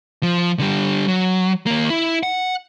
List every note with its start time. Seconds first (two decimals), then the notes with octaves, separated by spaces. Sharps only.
0.23 F3
0.59 D3 G3
1.08 F#3
1.66 D#2 A#3
1.90 E4
2.23 F#5